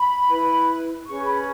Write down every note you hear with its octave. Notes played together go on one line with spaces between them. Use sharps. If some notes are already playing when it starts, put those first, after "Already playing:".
Already playing: B5
E4 B4
C#4 G#4 B4 C#6
B5